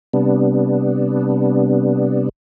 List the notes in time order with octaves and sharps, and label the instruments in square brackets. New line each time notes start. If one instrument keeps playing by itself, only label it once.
[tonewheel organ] C3 G3 B3 D4